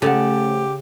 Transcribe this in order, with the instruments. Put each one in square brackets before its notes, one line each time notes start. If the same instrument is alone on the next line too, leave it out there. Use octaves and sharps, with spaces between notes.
[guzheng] C#3 [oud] F3 A3 C#4 [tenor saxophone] G4 [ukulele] A4 F#5